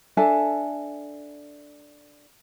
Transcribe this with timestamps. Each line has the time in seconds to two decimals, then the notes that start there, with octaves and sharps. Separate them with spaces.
0.17 D4 A4 E5 G#5